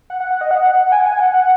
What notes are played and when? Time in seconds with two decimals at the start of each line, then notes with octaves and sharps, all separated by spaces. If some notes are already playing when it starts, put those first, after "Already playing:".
0.10 F#5
0.20 F#5
0.30 F#5
0.41 D#5
0.51 F#5
0.92 G#5
1.01 F#5
1.06 G#5
1.20 F#5
1.33 F#5